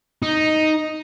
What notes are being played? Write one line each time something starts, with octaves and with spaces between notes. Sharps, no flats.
D#4